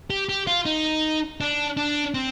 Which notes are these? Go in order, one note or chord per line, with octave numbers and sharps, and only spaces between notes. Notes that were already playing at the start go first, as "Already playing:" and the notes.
G4
G4
F4
D#4
D4
D4
C4